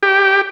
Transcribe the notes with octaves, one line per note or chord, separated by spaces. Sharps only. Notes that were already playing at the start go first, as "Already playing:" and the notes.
G4